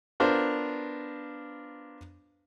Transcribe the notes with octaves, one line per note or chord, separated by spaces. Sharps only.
B3 D4 F4 A#4 C5